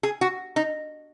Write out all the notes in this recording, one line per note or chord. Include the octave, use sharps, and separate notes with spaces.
G#4
F#4
D#4